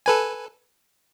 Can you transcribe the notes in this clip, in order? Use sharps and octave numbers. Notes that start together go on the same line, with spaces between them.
A4 B4 G#5